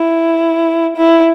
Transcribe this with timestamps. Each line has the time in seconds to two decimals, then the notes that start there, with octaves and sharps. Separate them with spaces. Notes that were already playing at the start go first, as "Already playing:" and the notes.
Already playing: E4
0.97 E4